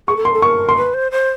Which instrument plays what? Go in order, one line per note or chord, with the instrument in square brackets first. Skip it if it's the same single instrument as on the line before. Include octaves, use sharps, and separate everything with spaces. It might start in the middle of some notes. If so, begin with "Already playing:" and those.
[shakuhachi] G#4 [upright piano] C#6
[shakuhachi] A4
[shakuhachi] A#4 [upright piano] C6
[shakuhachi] A4
[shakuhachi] A#4 [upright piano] C#6
[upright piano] C6
[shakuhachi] B4
C5
C5